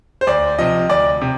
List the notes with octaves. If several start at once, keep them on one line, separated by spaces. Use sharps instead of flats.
C5
D2 D5
C3 F3 D#5
D2 D5
C3